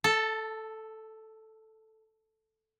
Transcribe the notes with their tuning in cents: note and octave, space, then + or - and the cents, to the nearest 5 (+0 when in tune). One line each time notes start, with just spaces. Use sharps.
A4 +0 A5 +30